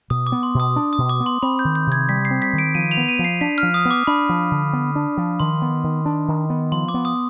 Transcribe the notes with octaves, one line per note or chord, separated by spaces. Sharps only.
B2 D#6
D6
B3
C6
B2
D#6
D4
D#6
B2
D6
B3
C6
C4 B5
G6
D#3
G6
C3 G#6
G3 B6
C7
C4
B6
D#3
D7
F3 D#7
F7
B3
D#7
F3
C7
D4 B6
F3 F6
D#6
B3
D6
D4 B5
F3
D3
B3
D4
F3
D#3 C6
B3
D#3
D4
D#3
B3
F3 C6
D6
B3
D#6